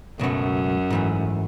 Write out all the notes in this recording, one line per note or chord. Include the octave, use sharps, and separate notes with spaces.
C#2 F#2 B2 F#3 A3
G#2 E3 A3